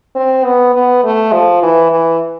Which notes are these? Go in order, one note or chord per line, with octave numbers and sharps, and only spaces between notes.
C4
B3
B3
A3
F3
E3
E3